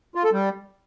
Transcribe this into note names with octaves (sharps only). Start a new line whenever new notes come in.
F4
A4
G3